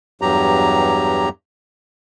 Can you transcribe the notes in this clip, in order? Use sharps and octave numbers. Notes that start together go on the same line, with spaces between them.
E2 G2 F#3 G4 A#5